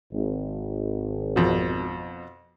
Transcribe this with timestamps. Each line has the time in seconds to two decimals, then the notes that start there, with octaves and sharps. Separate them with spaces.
0.12 G#1
1.36 F2 B2